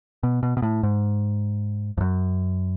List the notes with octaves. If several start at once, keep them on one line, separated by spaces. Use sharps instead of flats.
B2
B2
B2
A2
G#2
F2
F#2